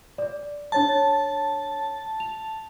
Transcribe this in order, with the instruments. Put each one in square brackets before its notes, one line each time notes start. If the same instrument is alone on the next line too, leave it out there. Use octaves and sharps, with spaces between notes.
[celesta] D5
[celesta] D4 C#5 A6 [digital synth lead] A5
[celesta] F7